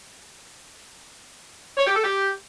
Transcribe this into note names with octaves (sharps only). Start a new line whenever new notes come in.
C#5
G4
A4
G4